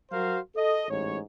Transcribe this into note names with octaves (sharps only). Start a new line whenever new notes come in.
F#3 F#4 A#4 C5 F5
A4 D#5
A1 G#2 C#5